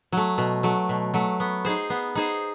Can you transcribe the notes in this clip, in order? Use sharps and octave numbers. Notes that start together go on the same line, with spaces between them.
F#3 A3
B2
F#3 A3
B2
F#3 A3
B3
D#4 G#4 C5
B3
D#4 G#4 C5